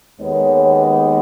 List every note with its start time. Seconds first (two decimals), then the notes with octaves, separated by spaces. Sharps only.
0.20 D#2 D#3 G#3 B3 D#4 C#5